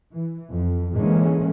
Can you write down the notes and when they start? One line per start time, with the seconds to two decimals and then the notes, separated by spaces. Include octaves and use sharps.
0.13 E3
0.52 F2
0.98 D3 E3 G#3 A#3 C#4